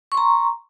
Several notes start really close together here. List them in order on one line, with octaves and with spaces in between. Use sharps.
C#6 C6 A#5